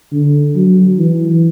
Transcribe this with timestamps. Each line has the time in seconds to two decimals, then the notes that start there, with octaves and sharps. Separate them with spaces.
0.12 D3
0.56 F#3
0.98 E3